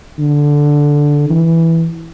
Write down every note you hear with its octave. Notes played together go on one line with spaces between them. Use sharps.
D3
E3